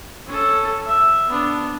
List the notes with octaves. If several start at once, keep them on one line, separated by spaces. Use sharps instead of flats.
C#4 A4
E5
B3 D4